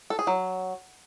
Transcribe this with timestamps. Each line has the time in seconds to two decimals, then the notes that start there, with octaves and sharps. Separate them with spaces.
0.10 A4
0.19 G#4
0.27 F#3